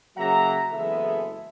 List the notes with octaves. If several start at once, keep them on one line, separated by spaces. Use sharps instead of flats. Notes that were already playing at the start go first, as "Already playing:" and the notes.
C#3 F#3 A#3 E5 F#5 A#5
F#1 E3 G#3 B3 A4 E5